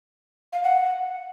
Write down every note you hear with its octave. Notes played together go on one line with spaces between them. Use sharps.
F5
F#5